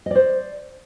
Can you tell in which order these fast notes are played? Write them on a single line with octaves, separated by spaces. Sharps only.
D#5 D5 C5